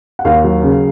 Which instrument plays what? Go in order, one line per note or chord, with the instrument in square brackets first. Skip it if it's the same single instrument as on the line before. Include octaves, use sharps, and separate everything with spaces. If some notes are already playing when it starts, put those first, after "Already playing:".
[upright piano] F#5
D#2 F5
F#3
C#3